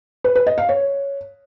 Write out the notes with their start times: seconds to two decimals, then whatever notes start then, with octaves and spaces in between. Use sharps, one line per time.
0.24 B4
0.35 B4
0.47 D#5
0.58 F5
0.69 C#5